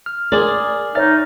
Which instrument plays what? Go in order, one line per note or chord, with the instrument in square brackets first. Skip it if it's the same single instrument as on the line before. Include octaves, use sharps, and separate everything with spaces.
[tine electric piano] F6
[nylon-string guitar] G#4 D5 [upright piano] A#4 C6 F#7
[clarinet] D#4 [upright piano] C#5 E5 [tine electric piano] F6 A6